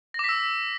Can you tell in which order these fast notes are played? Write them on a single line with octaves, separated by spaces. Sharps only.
A#6 D6 B6 E6